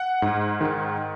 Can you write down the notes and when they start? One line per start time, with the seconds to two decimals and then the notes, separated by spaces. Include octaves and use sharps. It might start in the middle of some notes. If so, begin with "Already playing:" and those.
Already playing: F#5
0.22 G#2
0.61 D#3